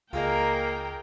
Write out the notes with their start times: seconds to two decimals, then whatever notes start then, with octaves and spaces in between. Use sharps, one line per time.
0.13 C#2 A#3 F4 G#4 A#4 D#5 G5